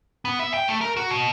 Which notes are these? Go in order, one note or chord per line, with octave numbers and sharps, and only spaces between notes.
B3
E5
G5
A3
A#4
F#4
B2